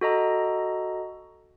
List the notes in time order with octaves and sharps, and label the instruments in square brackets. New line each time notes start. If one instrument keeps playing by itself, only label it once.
[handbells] F#4 A4 D#5 A#5